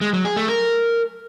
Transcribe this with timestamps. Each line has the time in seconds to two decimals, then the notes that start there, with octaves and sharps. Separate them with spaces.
0.01 G#3
0.13 F#3
0.25 G#4
0.36 A3
0.48 A#4